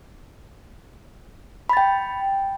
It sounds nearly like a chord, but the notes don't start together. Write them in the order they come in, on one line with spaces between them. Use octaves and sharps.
B5 A6 G5